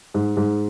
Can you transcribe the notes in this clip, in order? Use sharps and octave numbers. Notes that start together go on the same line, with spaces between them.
G#2
G#2